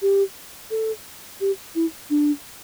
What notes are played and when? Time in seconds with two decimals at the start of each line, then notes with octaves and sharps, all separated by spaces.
0.02 G4
0.71 A4
1.41 G4
1.75 E4
2.10 D4